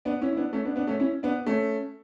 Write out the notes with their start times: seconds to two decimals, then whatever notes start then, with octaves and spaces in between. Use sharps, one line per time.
0.05 B3 D4
0.21 C#4 E4
0.33 E4
0.37 B3 D4
0.53 A3 C#4
0.65 B3 D4
0.76 B3 D4
0.87 A3 C#4
1.00 C#4 E4
1.23 B3 D4
1.47 A3 C#4